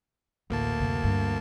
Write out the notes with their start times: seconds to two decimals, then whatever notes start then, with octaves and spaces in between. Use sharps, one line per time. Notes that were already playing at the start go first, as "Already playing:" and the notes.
0.50 A1 D2 A#3 A5
0.80 F#2 C3
1.04 G2